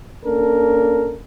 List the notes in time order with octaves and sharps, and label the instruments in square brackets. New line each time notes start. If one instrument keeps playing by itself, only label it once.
[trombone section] A#3 C#4 D4 A4 A#4